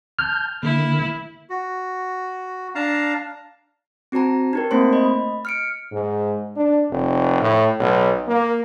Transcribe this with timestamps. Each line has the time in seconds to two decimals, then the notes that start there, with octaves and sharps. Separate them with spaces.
0.19 A5 F6 G6
0.63 D3 A#3 E4
1.50 F#4
2.75 D4 F5 A5 A#5
4.12 C4 F#4 C5 A5 A#5
4.53 D#4 G4 A#4
4.71 A3 A#3 C4 C5 C6
4.93 D#5 B5
5.45 F6 C#7 D7
5.92 G#2
6.56 D4
6.91 F1
7.41 A2
7.80 B1
8.28 A#3